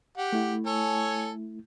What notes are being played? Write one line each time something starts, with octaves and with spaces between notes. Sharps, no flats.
G4 F#5
A3 E4
A4 C#5 G#5